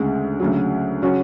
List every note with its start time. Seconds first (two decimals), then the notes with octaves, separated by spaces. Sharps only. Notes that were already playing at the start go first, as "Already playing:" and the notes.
Already playing: D2 C#3 G#3
0.40 D2 C#3 F#3
1.02 C#3 F#3 C#4 F#4